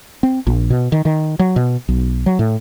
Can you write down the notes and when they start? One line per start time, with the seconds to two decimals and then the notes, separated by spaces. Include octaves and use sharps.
0.23 C4
0.47 A#1
0.70 B2
0.92 D#3
1.05 D#3
1.39 F#3
1.56 B2
1.88 B1
2.26 F#3
2.39 A2